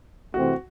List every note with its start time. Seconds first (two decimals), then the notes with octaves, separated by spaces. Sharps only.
0.34 C3 E3 A3 C4 F#4